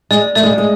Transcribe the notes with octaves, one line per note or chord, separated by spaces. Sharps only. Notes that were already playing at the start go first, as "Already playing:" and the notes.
G#3 D5
A3 D5
G#3
G3
G#3